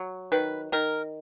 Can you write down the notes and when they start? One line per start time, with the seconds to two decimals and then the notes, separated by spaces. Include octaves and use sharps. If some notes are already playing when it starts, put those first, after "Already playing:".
Already playing: F#3
0.32 D#3 B4
0.72 D#3 A#4